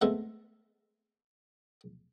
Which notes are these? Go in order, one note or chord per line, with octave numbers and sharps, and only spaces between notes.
G#3 A3 B3 C4 A4 E5